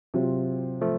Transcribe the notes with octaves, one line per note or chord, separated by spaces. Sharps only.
C3 F#3 C4 F4
F3 A3